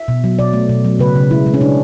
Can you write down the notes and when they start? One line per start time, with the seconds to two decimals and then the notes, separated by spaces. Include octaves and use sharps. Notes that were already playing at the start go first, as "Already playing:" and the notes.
Already playing: E5
0.08 B2
0.24 F#3
0.39 B2 D5
0.53 A3
0.69 B2
0.84 F#3
0.99 C#3 B4
1.16 C#3
1.31 G#3 E4
1.46 G#3
1.54 C#4
1.61 C#3 D4